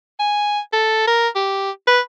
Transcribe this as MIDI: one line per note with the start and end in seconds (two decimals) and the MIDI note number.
0.20 0.60 80
0.73 1.03 69
1.08 1.28 70
1.36 1.71 67
1.87 2.00 71